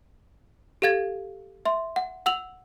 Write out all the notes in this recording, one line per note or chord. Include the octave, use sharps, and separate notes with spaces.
G4 A4 F5 G#6 A6
E5 C6
F#5
F#5 E6 F7 F#7